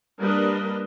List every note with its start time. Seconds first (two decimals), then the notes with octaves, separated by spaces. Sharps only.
0.21 G3 A#3 D4 A#4 B4 D#5